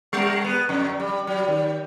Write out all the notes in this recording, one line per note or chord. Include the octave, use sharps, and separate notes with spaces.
G3 A#4
B3
F2 D3
G3
F#3 G3
D#3